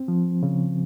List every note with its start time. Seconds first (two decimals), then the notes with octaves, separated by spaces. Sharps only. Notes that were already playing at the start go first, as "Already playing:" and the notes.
Already playing: C4
0.08 F3
0.43 C#3